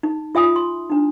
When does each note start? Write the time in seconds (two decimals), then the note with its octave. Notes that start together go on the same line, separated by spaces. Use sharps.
0.03 D#4
0.35 F4 E5 G#5 D#6
0.56 C6
0.90 D4 D#4